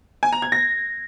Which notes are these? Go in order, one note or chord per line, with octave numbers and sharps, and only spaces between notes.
G#5
A#5
G#6
A#6